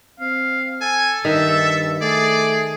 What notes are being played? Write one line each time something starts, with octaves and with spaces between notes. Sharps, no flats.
C4 F5
A4 G#5
G2 D#3 E5
A3 G#4 D5